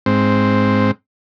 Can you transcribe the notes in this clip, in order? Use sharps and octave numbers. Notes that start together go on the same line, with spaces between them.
G#2 C4